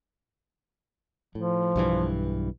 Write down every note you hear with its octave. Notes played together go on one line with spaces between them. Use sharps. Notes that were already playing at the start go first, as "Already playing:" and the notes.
A2 F3
B1 G2 E3